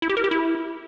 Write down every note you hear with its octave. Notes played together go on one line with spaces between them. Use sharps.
E4
G4
A#4
G4
E4